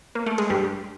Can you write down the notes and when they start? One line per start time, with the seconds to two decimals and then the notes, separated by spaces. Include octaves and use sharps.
0.15 A#3
0.26 A3
0.38 G#3
0.50 G2 G3